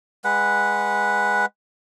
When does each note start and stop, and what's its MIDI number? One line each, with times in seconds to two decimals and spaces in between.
0.25 1.46 56
0.25 1.46 71
0.25 1.46 78